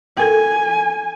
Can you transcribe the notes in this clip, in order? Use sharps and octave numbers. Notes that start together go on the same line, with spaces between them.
A4 A#4 G5 G#5